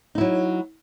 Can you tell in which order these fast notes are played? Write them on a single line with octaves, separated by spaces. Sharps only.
D#4 E4 F#3